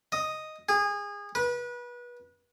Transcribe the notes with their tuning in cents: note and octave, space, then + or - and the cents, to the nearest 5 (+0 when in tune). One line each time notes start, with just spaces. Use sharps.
D#5 +0
G#4 -25
B4 -30